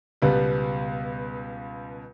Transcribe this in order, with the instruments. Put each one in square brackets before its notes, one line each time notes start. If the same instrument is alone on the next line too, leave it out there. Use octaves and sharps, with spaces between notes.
[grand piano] C#2 B2 G3 B3